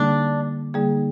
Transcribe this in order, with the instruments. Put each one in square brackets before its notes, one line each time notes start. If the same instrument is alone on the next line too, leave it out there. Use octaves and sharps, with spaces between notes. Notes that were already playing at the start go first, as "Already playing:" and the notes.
Already playing: [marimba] D3 G3 A#3 D#4 G#4 [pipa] D4
[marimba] D3 G3 A#3 D#4 G#4